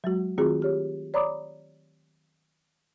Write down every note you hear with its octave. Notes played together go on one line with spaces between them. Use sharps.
F#3 G#3 F#4
D#3 A3 C4 F4 F#4 G#4
G4 C#5
C#5 D5 A#5 B5 D6 D#6